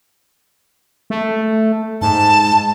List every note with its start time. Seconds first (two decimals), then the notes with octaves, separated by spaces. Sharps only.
1.10 A3
2.02 G#2 A5